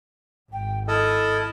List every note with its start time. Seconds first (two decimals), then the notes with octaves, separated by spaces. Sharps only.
0.52 G#1 G5
0.88 E4 A4 D#5 F6